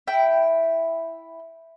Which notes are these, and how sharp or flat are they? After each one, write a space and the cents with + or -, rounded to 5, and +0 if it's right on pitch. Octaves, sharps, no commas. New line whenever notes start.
E4 +0 G5 -5